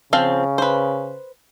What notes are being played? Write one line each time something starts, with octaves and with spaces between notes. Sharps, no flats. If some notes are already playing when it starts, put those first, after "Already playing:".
C#3 F3 C4 F5
B4 C5